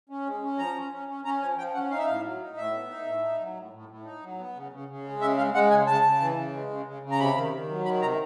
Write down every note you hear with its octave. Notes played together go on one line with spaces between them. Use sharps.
C#4
G#3
C#4
F3 A#5
C#4
C#4
C#4
C#4 A#5
F3 G#5
F3 G5
C#4 F#5
D#4 F5
E5
A2 F5
F#3
D#4
A2 E5
B3
D#4
A2
D#4
F#3
A2
A2
A2
D#4
F#3
B3
C#3
C#3
C#3
G#3
C#3 E5
G#3 F5
G#3 F#5
C#3 G#5
C#3 A5
C#3
E3
C#3
G#3
C#3
C#3
C#3
A#5
C3 B5
D#3
D#3
F#3
D#3 B5
C3 A#5